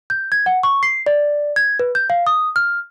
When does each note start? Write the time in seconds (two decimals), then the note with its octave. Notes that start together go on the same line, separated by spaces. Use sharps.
0.10 G6
0.32 G#6
0.46 F#5
0.63 C#6
0.83 C7
1.06 D5
1.56 G#6
1.80 B4
1.95 G6
2.10 F5
2.27 D#6
2.56 F6